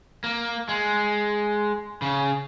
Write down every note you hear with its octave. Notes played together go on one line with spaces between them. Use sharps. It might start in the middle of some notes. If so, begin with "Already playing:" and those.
A#3
G#3
C#3